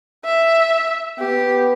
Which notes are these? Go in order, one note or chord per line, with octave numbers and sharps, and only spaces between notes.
E5
B3 G4